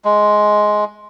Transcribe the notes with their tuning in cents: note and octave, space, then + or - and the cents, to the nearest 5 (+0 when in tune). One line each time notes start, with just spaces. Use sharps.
G#3 +10